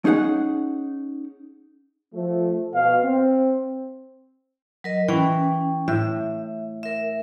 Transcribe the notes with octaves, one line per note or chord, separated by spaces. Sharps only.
C#4 D#4 G#4 F#5
F3 A3
B2 F5
C4
F#3 A#4 D#5
E3 C#4 G5
A2 E5
A#4 E5